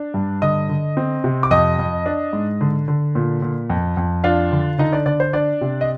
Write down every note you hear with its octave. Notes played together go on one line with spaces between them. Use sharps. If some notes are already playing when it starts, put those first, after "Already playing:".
Already playing: D4
G2
D3 D#5 D#6
D3
C4
C3
D6
F2 D#5 D#6
F2
D4
G#2
D3
D3
A#2
A#2
F2
F2
D4 F4 F5
D3
D3 D#4 D#5
D4 D5
D3 D4 D5
C5
D4 D5
C3
D#5